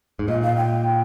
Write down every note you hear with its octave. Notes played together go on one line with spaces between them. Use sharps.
G#2
A#2 D#5
F5
G5